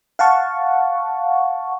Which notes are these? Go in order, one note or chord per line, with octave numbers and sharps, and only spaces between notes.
F5 F#5 A5 C#6